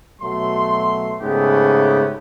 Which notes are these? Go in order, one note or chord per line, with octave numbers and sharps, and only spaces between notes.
B2 F#3 A3 C6
G#2 C#3 A3 B3 G4